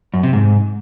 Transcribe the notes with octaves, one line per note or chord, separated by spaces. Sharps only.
F#2
C3
G#2